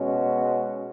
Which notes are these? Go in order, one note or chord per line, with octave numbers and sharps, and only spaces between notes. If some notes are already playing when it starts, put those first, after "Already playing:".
Already playing: B2 G#3 C#4 F#4